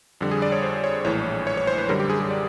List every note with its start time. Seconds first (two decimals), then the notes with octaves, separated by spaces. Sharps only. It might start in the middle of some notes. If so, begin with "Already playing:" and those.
0.21 F2 D3 G3
0.31 G#4
0.42 D5
0.52 C#5
0.63 C5
0.84 C#5
1.05 A#1 A2 E3 C#5
1.47 C#5
1.57 C#5
1.67 C5
1.78 B4
1.89 F#2 D3 G3 A#4
2.00 G4
2.10 G#4
2.20 G#4
2.30 D5